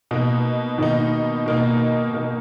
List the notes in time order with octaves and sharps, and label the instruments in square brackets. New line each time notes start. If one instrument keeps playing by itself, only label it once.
[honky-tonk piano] B2 A#3 D#4
[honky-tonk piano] B2 A#3 D#4 [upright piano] D#3
[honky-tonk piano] B2 A#3 D#4
B2 A#3 D#4